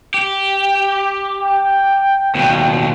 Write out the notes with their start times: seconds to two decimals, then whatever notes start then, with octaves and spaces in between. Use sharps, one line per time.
0.14 G4
1.42 G5
2.35 D#2 B2